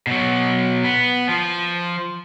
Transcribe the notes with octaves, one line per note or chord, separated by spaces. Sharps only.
B2 F#3
B3
F3